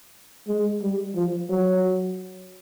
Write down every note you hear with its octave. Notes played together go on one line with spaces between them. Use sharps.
G#3
G3
F3
F#3